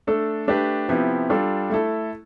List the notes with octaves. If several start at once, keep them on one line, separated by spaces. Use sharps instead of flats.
A3 D4 A4
A3 D4 G4 B4
C3 F3 B3 E4 G4
G3 D4 F4 A4
A3 E4 A4